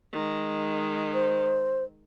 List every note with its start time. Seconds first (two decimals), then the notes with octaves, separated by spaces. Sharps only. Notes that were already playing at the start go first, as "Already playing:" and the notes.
0.12 D#3 G#3
1.14 C5